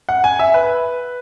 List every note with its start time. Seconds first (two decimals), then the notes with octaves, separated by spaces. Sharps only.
0.09 F#5
0.24 G#5
0.39 E5
0.54 B4